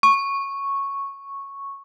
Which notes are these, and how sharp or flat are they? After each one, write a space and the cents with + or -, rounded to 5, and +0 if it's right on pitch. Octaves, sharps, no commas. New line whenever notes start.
C#6 -5